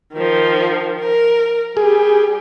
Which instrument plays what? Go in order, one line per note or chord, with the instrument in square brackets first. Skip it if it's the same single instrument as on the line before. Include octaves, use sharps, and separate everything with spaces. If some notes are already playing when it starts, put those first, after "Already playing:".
[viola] D#3 F3
A#4
[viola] G3 G4 [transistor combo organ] G#4